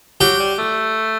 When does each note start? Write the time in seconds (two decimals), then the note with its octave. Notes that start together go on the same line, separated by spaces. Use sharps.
0.21 F#3 G4
0.39 G3
0.59 A3